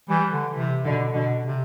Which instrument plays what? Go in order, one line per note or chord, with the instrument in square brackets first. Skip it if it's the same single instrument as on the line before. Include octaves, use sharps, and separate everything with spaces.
[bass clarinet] E3 [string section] G3
[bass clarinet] D3
[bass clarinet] C3 [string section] E3
[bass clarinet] B2 [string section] D3
[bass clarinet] B2 [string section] D3
[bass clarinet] C3